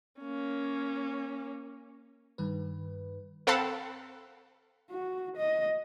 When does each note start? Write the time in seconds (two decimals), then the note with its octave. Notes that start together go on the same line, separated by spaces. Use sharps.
0.21 A#3 C#4
2.38 G2 D#3 B4
3.47 C4 A4 F5 F#5 A5 B5
4.91 F#4
5.36 D#5